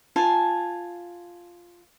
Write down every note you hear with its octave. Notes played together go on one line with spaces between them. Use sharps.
F4 G#5 A5